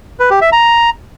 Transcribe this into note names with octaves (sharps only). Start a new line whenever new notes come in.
B4
G4
E5
A#5